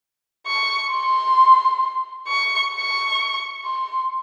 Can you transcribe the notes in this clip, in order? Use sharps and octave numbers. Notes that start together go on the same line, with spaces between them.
C#6
C6
C#6
C#6
C6